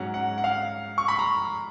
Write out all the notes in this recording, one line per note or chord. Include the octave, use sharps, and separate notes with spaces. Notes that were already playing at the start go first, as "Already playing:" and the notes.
Already playing: G#2 F#3 C#4 F#5
F#5
F#5
F5
C#6
B5
A#5